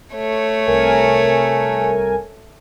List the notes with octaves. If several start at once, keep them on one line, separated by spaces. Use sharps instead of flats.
A3 C#5
C2 A#4 G#5